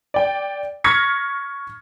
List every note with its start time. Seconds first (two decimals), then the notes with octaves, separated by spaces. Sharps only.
0.14 D5 G5
0.84 C#6 F6 G#6 A#6 B6 C#7